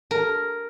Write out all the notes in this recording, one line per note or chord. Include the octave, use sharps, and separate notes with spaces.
A#4